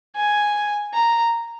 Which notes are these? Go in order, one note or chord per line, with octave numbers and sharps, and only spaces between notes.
G#5
A#5